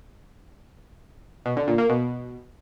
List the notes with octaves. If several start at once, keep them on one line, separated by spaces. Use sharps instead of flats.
B2
D3
A#2
A#3
B2